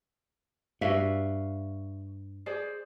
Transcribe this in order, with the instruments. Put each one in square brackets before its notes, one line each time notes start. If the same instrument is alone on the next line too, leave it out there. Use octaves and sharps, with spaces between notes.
[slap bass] G2 [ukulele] F#4 E5 F5
[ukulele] G#4 C5 D5